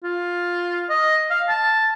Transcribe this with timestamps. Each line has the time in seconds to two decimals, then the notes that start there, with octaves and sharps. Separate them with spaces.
0.03 F4
0.90 D#5
1.30 F5
1.48 A5